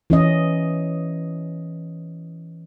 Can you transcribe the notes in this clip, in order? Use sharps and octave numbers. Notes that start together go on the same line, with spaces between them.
E3 C#4 D#5